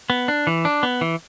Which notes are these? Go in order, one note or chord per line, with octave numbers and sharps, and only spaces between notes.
B3
D4
E3
D4
B3
E3